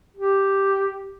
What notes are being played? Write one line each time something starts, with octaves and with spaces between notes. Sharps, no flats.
G4